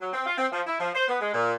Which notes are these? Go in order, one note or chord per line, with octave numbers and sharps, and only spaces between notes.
F#3
C4
F4
C4
F3
E4
F3
C5
B3
G#3
A#2